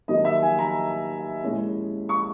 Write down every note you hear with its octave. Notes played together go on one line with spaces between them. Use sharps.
D#2 D#3 F#3 A#3 D#5
E5
G#5
A#5
A#2 G#3 C#4 E4
C#6